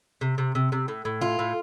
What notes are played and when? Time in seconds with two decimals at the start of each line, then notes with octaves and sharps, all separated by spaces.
0.21 C3
0.38 C3
0.55 C3
0.72 C3
0.88 A2
1.05 A2
1.21 F4
1.39 A2